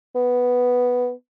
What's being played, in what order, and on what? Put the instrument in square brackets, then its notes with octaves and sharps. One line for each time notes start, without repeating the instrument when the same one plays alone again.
[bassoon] B3